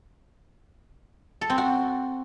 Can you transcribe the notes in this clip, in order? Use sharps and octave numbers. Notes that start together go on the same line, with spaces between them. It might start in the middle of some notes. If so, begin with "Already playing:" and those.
A4
C4
F#4